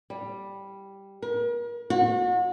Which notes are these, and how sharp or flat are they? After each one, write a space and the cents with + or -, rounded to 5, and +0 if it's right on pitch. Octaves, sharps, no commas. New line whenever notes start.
G3 +0
A#4 +40
F#4 -35